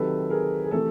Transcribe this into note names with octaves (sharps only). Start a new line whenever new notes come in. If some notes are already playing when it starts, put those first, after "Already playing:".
Already playing: C3 D#3 F#3 A4 B4
G#4 A#4
G#4
C3 E3 A3 A4